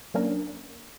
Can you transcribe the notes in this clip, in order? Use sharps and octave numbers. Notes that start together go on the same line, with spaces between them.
F#3 A#3 C#4 D4 A#4